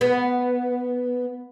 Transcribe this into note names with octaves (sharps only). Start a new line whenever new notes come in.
B3